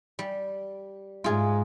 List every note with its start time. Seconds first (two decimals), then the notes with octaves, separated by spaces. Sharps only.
0.19 G3
1.24 G#2 F4 G#4